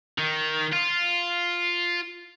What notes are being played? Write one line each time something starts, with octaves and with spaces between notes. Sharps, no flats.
D#3
F4